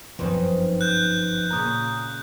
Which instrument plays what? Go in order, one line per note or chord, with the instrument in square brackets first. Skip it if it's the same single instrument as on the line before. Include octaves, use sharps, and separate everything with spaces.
[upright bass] G1 F#2 [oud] D#3 C4 C#4 [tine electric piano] F3 B4 C5
[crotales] F#6 G6
[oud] A#2 C#3 [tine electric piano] A#5 D#6